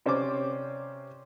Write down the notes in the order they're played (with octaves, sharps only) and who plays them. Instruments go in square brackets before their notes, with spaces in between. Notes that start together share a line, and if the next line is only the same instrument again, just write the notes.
[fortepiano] C3 C#4 C5 D5 D6